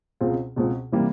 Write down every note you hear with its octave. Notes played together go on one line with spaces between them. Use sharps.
C#2 B2 G#3 C4 F4
C#2 B2 G#3 C4 F4
C3 E3 G3 A#3